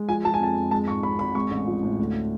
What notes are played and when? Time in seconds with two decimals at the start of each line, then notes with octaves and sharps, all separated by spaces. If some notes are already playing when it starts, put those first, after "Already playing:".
Already playing: G#3
0.09 F3 G#5
0.24 F3 A5
0.34 G#5
0.40 F2 A5
0.56 F2
0.71 G#3 A5
0.88 G#2 C#6
1.03 G#1 B5
1.19 G#1 B5
1.35 G#3 C#6
1.51 A1
1.67 F3
1.83 A2
1.99 D2